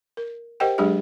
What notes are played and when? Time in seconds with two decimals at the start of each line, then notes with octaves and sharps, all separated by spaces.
0.17 A#4
0.60 G4 A#4 C5 D#5 F#5 G5
0.78 F#3 G#3 D4 G4 G#4 E5